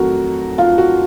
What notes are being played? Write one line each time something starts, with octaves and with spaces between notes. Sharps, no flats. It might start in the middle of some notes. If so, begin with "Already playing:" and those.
Already playing: F2 D#3 F#3 A3 F#4 A#4
F4
F#4